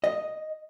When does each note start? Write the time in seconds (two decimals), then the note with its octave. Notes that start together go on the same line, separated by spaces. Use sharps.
0.04 D#5